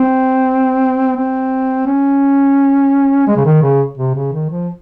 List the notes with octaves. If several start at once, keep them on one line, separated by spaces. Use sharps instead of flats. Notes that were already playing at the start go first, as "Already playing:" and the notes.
Already playing: C4
C4
C#4
G#3
C#3
D#3
C#3
C3
C#3
D#3
F3